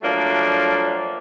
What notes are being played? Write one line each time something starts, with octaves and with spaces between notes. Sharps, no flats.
F3 F#3 A3 A#3 D4